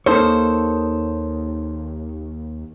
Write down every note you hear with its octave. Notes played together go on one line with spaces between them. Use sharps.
D#2 A#3 D#4 A4 C5 C#5